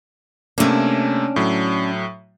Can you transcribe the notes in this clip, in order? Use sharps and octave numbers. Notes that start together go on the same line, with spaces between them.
C3 A3 A#3 C#4 D4
A2 F#3